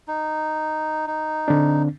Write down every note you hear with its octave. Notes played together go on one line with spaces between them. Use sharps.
D#4
D#4
D3 C4 D4